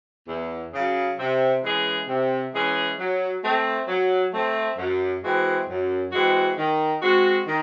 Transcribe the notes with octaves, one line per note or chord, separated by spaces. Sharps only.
E2
C#3 F#3
C3
E3 G#3 C#4 G#4
C3
E3 G#3 C#4 G#4
F#3
A3 C4
F#3
A3 C4
F#2
E3 G#3 C4 F#4
F#2
E3 G#3 C4 F#4
D#3
G#3 C4 F#4
D#3